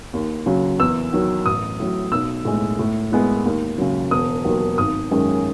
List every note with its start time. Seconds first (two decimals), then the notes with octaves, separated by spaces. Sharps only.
0.13 D#2
0.46 C#3 F#3
0.79 E2 E6
1.13 D#3 F#3
1.46 A1 D#6
1.80 A2 F#3
2.12 B1 E6
2.45 A2 G#3
2.79 A2
3.12 G#3 B3 E4
3.45 D#2
3.78 C#3 F#3
4.11 E1 D#6
4.45 D#2 D#3 F#3
4.78 G#1 D#6
5.11 F#2 D#3 G#3 C#4